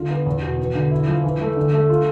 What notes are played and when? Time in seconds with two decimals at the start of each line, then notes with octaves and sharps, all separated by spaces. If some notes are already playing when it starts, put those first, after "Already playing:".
Already playing: D3 F4
0.10 B3
0.26 E2
0.42 B2
0.59 B3
0.75 D3
0.91 E4
1.08 F3
1.24 E3
1.41 A3
1.57 D3
1.73 A3
1.89 F4